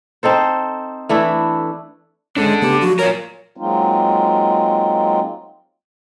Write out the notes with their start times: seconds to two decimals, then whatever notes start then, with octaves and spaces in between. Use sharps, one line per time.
0.23 C4 D#4 A4 C5
1.09 E3 A3 D4 E4
2.37 G#1 G#3 C#4 D4 A4
2.62 C#3 A3 B3 G4
2.81 F3 F#3 F#4
2.99 F4 A#4 C#5
3.57 F#3 G#3 A#3 C4 D#4 F4